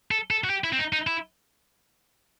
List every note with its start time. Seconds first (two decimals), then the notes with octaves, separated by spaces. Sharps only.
0.11 A4
0.30 A4
0.44 F#4
0.50 G4
0.64 E4
0.73 C4
0.78 D#4
0.92 D#4
1.07 E4